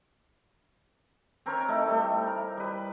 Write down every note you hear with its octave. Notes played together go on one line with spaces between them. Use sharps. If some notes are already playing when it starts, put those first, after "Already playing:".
C4 A#4 B4 C#5
A3 D#4 E4
G3 A3
A#4
G3 B4